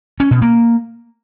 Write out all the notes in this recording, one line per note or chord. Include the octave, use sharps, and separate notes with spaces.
C#4
B2
A#3